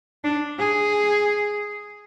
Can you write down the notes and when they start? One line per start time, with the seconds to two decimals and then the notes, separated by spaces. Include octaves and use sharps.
0.24 D4
0.58 G#4